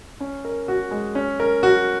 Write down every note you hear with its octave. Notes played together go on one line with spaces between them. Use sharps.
C#4
A#4
F#4
G#3
C#4
A#4
F#4